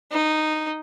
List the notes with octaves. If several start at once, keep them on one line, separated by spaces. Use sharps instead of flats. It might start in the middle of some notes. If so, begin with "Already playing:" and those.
D#4